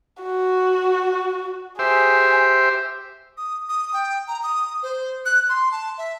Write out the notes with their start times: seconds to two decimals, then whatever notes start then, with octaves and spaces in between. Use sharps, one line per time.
0.23 F#4
1.79 G4 G#4 C5 E5
3.37 D#6
3.69 D#6
3.94 G5
4.28 A#5
4.43 D#6
4.83 C5
5.25 F#6
5.49 C6
5.72 A5
5.98 E5